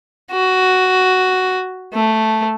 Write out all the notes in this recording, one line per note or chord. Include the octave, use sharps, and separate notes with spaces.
F#4
A3